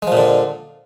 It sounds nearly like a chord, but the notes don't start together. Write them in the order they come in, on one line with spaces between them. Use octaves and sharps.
G#3 F3 A#2 D3